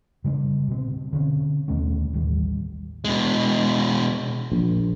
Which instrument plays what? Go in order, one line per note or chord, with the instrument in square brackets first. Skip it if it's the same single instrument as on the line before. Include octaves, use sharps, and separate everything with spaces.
[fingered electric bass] C#3 G3 B3 D4
B2 C4
D3 C4 C#4
D#2 B2 A3 C#4
A1 D#2 G3
[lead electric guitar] B2 G#3
[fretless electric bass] A#1